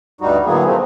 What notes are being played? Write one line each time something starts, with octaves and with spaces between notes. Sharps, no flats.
D2 G2 G3 D#4 F#4
A2 D3 F#3 A#3 B3 G#4
B2 D#3 F3 A3 C4